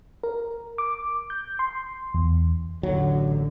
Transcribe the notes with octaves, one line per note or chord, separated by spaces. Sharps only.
A#4
D6
G6
C6
E2
A1 D#2 D3 F#3